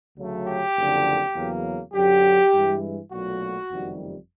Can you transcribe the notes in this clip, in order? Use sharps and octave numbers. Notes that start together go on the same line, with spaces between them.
D2 C#3 F#3 A3
G4
F#1 F2 D3
E2 C#3 F#3 A#3
F#2 D3 F#3 G4
G2 E3 G#3
B1 A#2 F#3 A3 F#4
F#1 F2 C3 D#3 G3